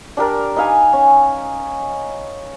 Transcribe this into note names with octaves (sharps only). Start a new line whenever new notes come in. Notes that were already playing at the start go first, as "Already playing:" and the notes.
D4 G4 A#4 D5
D#4 B4 F5 G#5
C#4